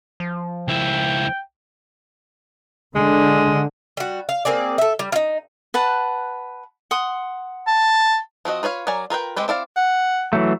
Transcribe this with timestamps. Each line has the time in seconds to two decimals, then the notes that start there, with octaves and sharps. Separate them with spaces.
0.20 F3
0.68 C#2 E4 G5
2.96 D3 G#3
3.97 G3 F#4
4.29 F5
4.45 A#3 C4 G#4 D5
4.78 A4 E5
4.99 G3
5.12 D#4 F4
5.74 B4 F#5 A5
6.91 F#5 C6 D#6
7.67 A5
8.45 F3 C4 F#4 D#5
8.63 F4 B4 C#5 F5
8.87 F#3 A#4 D5 G#5
9.10 F4 A#4 B4 G5
9.36 G#3 C4 G4 B4
9.48 C4 E4 D5 F5
9.76 F#5
10.33 E3 F#3 A3